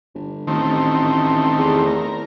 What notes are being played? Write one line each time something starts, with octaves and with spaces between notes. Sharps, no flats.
G1
A1 D#3 A3 C4
E2
A#4